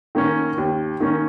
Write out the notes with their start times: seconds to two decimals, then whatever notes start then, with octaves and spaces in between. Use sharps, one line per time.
0.15 D#3 A#3 C#4
0.58 D#2
1.00 D#3 A#3 C#4